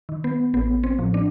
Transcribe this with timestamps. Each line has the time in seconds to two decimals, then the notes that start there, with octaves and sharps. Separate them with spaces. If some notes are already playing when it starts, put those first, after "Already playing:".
0.09 D#3
0.24 B3
0.54 A1 B3
0.84 C4
0.99 A2 F3
1.14 D4